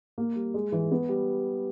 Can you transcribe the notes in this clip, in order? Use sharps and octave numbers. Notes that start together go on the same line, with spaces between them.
A#3
G3
G#3
E3
B3
G3